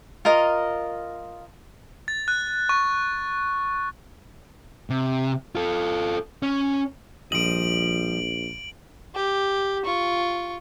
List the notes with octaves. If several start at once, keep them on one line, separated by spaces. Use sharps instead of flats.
F4 A#4 D#5
A6
F#6
C#6
C3
F4 A4
C#4
A#1 F3 G3 D#5 D7 F#7
G4
F4 C#6